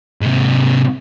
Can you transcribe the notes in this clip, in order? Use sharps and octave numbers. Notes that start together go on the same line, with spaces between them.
G#2 C3